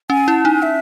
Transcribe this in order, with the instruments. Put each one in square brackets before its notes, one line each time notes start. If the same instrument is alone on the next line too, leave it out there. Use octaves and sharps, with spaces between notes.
[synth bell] C#4 [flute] G#5
[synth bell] E4 [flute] A5
[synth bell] D#4 [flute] G#5
[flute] E5